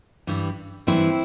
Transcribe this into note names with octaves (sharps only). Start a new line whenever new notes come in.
G2 E3 G3
G2 E3 G3 C4 E4